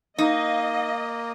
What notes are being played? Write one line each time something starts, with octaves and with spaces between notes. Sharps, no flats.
A#3 D#4 D#5 F5